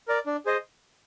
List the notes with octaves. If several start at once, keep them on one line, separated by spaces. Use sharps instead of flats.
A#4 D5
D4
G#4 C5 D#5